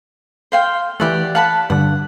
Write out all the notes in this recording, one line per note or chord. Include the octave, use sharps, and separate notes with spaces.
C5 F5 G5
E3 A3 G4 D5 F#5
F5 F#5 A5 B5 F#6
G2 D3 F#5